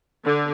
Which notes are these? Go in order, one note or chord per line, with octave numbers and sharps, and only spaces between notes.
D3